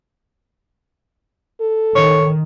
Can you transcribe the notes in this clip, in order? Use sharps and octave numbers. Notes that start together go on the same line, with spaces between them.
A4
D#3 C#5